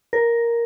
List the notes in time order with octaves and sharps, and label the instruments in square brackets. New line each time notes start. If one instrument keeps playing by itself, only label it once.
[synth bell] A#4